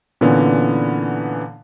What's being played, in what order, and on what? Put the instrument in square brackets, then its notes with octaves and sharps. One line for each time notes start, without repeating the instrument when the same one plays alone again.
[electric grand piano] A#2 D3 E3 B3 C#4